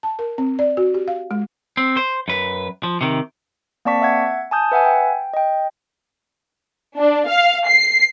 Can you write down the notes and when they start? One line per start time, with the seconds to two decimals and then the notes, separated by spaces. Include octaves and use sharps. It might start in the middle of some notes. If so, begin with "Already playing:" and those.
0.03 A5
0.19 A#4
0.38 C4
0.59 D5
0.77 F#4
0.94 G4
1.08 F5
1.31 G#3
1.77 C4
1.97 C5
2.28 F#2 B4
2.83 F3
3.01 C3 D#3
3.85 A#3 C4 D5 A5 C#6 B6
4.02 E5 F#5 G#6
4.51 G#5 A5 D#6 G6
4.72 B4 E5 F#5 G#5
4.85 G5
5.34 D#5 G5
6.97 D4
7.27 F5
7.67 C7